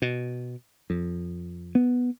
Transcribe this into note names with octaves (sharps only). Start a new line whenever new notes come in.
B2
F2
B3